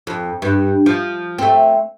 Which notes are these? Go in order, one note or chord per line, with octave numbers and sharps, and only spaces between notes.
F2
G2
F3
A3 C4